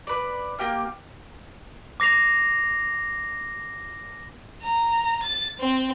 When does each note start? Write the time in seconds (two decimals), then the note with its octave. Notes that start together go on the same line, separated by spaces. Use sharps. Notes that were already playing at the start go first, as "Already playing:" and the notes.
0.07 B4 D5
0.59 A#3 G4 G5 F6
2.00 D6 A#6 C7 F7
4.62 A#5
5.23 A6
5.60 C4